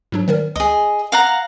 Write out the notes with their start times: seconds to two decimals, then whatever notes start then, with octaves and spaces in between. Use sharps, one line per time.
0.12 G#2 F#3 D4
0.28 D#3 G3 A#4
0.56 C#2 G#4 D#5
1.12 F5 F#5 A#5